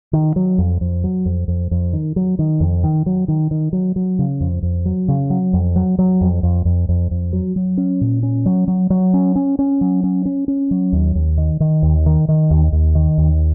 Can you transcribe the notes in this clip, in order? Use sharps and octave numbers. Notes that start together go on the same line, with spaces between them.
D#3
F#3
F2
F2
F#3
F2
F2
F2
D#3
F#3
D#3
F2
D#3
F#3
D#3
D#3
F#3
F#3
C#3
F2
F2
F#3
C#3
F#3
F2
F#3
F#3
F2
F2
F2
F2
F2
F#3
F#3
C#4
A#2
C#4
F#3
F#3
F#3
C#4
C#4
C#4
F#3
C#4
C#4
C#4
F#3
D#2
D#2
D#3
D#3
D#2
D#3
D#3
D#2
D#2
D#3
D#2